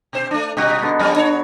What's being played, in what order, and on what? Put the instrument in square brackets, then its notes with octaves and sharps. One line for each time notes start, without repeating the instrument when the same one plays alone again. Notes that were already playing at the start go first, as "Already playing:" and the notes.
[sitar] B2 C5
A3 D4
[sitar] B2 G3 [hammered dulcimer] D#4 F#4 D#5
[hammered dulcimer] D3 B3
[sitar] F2 G3 C#4
D4 C#5